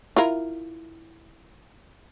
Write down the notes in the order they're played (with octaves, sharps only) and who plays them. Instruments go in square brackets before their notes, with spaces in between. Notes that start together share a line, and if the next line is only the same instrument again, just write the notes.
[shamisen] E4 F4 A#4